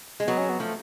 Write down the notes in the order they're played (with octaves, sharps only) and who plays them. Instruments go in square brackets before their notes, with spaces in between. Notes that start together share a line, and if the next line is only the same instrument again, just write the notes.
[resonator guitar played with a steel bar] G#3
[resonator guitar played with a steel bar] F#3 [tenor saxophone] B3
[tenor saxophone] C#4
B3
[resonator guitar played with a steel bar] F3 [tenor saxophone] A3